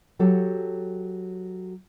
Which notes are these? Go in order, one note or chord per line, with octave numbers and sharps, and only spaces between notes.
F#3 G4 A4 C#5